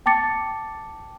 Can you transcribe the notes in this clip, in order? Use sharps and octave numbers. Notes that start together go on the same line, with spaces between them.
G5 A5 D6 A6 C#7